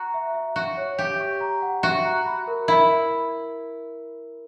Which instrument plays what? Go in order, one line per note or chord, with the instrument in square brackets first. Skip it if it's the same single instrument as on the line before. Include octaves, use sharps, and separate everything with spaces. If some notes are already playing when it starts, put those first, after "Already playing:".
Already playing: [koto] F#4 [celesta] A#5
[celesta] E5
E5
[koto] F#4 [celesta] E5
[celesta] C#5
[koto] G4 [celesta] G5
[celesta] C#6
A#5
F#5
[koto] F#4 [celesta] E5
[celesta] A#5
B5
A#4
[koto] E4 [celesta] A#4